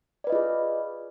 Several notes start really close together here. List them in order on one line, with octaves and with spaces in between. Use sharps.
D5 B4 D#5 F4 G#4